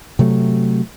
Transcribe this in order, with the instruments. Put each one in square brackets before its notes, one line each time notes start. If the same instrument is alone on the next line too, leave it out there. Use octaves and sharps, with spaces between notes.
[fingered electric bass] C3 F#3 A3